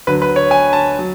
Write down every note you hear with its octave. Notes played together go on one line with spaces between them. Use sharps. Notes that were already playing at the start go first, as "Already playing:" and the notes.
D2 D3 F#3 B4
B4
C#5
G#5
A5
F#3